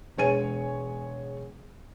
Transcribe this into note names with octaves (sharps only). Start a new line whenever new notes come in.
E1 G#3 C#5 G#5 D#7